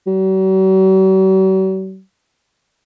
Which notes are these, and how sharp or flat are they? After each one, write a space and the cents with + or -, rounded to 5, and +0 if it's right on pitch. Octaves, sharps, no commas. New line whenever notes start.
F#3 +45